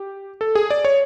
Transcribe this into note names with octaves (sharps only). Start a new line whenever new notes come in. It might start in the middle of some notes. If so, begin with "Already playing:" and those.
Already playing: G4
A4
G#4
D5
C#5